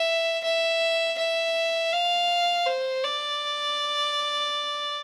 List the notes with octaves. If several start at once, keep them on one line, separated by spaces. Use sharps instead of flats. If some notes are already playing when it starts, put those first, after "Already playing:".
Already playing: E5
E5
E5
F5
C5
D5